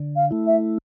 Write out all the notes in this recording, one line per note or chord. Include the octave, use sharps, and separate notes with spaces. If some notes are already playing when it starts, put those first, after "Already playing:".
Already playing: D3
F5
A3 E4
E5